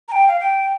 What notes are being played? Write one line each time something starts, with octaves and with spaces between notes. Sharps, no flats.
A#5
G5
F5
G5